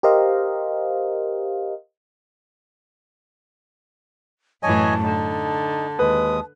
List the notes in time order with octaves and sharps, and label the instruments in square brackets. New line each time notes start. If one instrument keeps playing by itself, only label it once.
[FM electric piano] G4 A#4 C5 D#5 F5
[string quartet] F#2 A2 E3 [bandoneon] C#5 D#5 G#5 [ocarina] A5
[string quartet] D3 [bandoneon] D#4
[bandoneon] D#2 G#3 D#6 [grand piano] B4